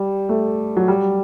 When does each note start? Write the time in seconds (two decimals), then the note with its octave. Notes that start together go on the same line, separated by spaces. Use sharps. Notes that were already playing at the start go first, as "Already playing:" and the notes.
Already playing: G3
0.29 A3
0.77 F#3
0.88 G3